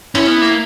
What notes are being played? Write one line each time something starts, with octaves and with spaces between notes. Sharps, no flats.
C#4 E4
B3
A#3